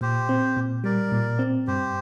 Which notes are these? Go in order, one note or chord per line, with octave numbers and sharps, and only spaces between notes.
A#2 G4 C5
C4
A#2
G3 A#4 D5
A#2
C4
G2 G4 C5